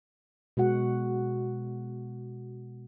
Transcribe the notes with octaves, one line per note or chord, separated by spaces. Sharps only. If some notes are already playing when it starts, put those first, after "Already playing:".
B2 G#3 F#4 F#5